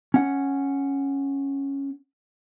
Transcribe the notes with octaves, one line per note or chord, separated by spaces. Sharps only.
C#4 F#5